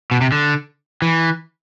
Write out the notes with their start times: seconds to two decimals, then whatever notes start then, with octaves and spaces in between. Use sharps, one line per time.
0.11 B2
0.21 C3
0.32 D3
1.02 E3